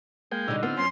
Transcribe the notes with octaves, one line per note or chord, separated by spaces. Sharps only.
G#3 A#3 G5
B2 D3 G3 D#4
B3 C4 F4
F#2 C#4 C6